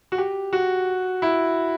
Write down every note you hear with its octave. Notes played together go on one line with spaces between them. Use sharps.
F#4
G4
F#4
E4